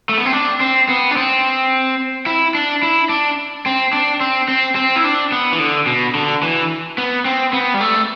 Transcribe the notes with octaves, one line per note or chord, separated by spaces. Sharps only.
A3
B3
C4
D4
C4
B3
D4
C4
E4
D4
E4
D4
C4
D4
C4
C4
C4
E4
D4
B3
E3
D3
B2
D3
E3
B3
C4
B3
G3
A3